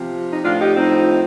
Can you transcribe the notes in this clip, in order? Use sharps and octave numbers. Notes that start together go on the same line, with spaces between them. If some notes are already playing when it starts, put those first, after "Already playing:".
Already playing: C3 F3
D#4
A2 F3 D4 F4
D#4 G4
C4 D#4